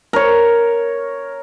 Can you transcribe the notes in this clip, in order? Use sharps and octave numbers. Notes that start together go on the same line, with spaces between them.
A#4 C#5